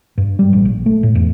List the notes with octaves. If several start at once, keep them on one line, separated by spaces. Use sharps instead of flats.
G2
G3
A1
A#1
A3
A2
E2